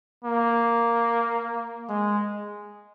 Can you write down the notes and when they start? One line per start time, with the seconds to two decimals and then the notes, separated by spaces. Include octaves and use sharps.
0.24 A#3
1.89 G#3